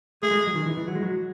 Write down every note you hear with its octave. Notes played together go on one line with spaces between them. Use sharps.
A3 G#4
G#3
F#3
D#3
E3
E3
F#3
G#3
F#3